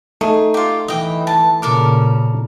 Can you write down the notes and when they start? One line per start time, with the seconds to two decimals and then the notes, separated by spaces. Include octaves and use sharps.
0.21 A3 D#4 G#4
0.54 F4 G4
0.88 E3 D#5 G5
1.27 A5
1.62 A#2 C#3 A4 A#4 D6